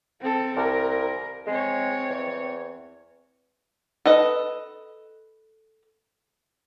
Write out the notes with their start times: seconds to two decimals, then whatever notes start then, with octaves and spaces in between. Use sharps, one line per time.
0.21 C4 A4
0.57 C2 A#4
1.47 G#3 C4 C#5
2.10 E2
4.06 A4 B4 D#5